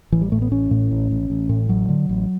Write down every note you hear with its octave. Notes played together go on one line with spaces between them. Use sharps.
A1 E3
G3
A2 A3
B3
A1 C#4
A2
A1
A1
A1
A2
A1 F#3
D3
A1